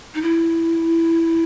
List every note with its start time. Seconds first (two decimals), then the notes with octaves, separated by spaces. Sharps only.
0.15 D#4
0.22 E4